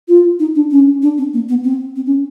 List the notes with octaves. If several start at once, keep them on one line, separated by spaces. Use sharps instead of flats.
F4
D#4
D4
C#4
D4
C4
A#3
B3
C4
C4
C#4